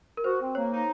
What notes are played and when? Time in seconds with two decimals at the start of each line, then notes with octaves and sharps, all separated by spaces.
0.17 A#4
0.24 F#4 C5
0.40 C4
0.55 A#3 C#5
0.71 D#4